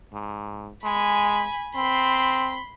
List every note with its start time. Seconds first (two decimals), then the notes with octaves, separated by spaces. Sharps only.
0.13 G#2
0.84 G#3 G#5 B5
1.75 C4 B5 C6